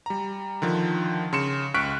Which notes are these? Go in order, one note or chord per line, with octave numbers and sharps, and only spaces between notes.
G3 A#5
D3 D#3 F3
C#3 C6 C#7 E7
C#2 C#6 F6 F#6 B6 D7